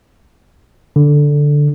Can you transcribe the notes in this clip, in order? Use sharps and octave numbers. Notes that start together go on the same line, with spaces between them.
D3